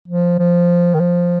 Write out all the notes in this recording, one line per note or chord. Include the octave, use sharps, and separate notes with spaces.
F3
F3
D#3
F3